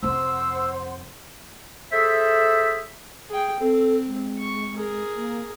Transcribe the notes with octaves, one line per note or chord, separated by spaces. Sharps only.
F2 C3 C5 F#5 C6 E6
G#4 A4 C5 E5
G#4 G5
C4 A4
G#3
C#6
G#4 A#4
A#3